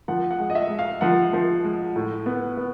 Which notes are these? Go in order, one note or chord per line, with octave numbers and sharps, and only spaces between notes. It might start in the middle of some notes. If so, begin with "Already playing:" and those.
F3 F#5
F#5
G#3
D#5
E5
G#3
F5
F3 F#5
F3
G#3
A2
B3
B3